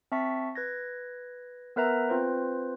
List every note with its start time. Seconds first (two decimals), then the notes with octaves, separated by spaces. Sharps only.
0.12 C4 E5 A5 C#6 B6
0.55 B4 G#6 A#6
1.76 B3 A#4 B4 E5 A#5
2.09 C4 F4 B4 C5